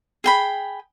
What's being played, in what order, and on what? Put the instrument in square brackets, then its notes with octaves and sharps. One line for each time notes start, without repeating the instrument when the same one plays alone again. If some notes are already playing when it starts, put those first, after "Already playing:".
[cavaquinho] G#4 G5 B5